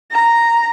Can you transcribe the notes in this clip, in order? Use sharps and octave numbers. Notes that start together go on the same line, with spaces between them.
A#5